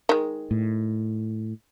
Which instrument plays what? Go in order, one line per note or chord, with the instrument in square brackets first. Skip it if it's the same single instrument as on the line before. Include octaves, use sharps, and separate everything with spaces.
[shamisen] D#3 G#3
[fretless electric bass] A2